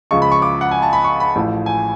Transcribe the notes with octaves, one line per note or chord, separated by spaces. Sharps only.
C#2 C#3 F3 C#6
B5
C#6
D6
F#5
G#5
A5
B5
C#6
B5
A1 A2 F3
G#5